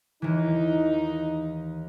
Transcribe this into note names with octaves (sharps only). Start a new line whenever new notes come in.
D#2 E3 D#4